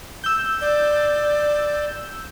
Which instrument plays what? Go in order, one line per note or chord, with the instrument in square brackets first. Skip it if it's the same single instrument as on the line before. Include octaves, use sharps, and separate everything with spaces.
[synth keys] E6 G6
[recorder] D5